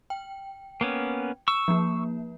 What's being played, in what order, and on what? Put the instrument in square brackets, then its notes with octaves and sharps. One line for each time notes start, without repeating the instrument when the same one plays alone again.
[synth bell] G5
[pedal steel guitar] A#3 B3 C#4
[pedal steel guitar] C#6 E6 [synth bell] E7
[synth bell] F3 A#3